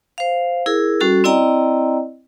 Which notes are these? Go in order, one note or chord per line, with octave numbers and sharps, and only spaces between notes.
C5 F5
E4 G#4 A#4
G3 C#4 F#4 A4
C4 E4 D5 D#5 G5 A#5